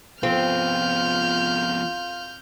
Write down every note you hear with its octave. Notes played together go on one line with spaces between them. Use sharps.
F3 B3 C4 F4 F6 G6